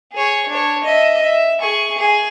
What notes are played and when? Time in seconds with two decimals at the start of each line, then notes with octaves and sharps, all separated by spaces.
0.13 G#4 C#5
0.48 D4 C#5
0.84 D#5 E5
1.22 E5
1.60 G#4 C#6
1.97 G#4